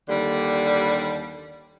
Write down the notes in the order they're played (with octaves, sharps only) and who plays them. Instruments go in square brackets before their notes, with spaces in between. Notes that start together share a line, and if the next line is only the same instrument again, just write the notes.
[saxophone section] D#2 D3 G3